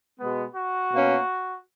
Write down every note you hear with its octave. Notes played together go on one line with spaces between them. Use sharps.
B2 G#3 B3
F#4
B2 A#3 C#4